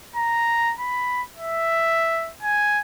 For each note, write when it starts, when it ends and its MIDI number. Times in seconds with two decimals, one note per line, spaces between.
0.16 0.74 82
0.80 1.22 83
1.36 2.32 76
2.43 2.81 80